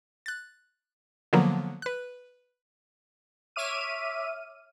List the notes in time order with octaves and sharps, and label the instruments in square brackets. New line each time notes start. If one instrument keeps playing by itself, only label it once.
[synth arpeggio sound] F#6 A6
D3 F3 F#3 A#3 B3
B4 F#6
[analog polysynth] C#5 E5 D6 F6 D#7